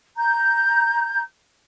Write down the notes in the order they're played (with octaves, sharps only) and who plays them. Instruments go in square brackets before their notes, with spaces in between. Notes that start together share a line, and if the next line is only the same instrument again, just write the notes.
[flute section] A#5 G6